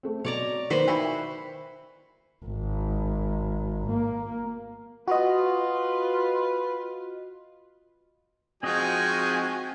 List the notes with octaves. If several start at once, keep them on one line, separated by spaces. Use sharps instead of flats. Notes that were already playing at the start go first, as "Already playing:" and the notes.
A3 C4
B2 C#5 D5 A#5
D#3 A#3 F#4 B4 C5
E4 F#4 G5 B5
G#1
A#3
F4 F#4 B4 D#5
F3 G#3 C4 D#4 F#4 D#5 G#5